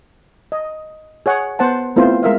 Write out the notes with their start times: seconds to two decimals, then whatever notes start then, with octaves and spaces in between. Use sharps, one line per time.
0.52 D#5
1.26 G#4 C#5 F#5
1.59 B3 C5 F#5 A5
1.96 A3 B3 C4 E4 F4 C5
2.23 G#3 A#4 E5 F5